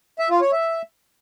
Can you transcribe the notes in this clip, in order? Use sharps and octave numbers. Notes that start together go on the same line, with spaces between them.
E5
F4
C#5
E5